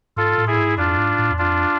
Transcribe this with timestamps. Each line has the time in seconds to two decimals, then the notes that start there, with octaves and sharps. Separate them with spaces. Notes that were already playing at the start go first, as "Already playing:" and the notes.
0.17 G#2 F4 A4
0.38 A2
0.47 E4 G#4
0.58 G#2
0.77 F2 D4 F4
0.97 G#2
1.19 A2
1.31 E2
1.38 F2 D4 F4